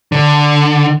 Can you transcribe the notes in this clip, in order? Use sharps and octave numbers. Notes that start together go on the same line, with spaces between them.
D3